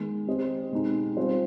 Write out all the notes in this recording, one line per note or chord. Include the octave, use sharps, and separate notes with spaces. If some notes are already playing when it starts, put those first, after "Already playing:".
Already playing: D#3 G#3 B3
C4 G4 C5 D#5
B2 G#3 C4 D#4
G3 C4 F4 C5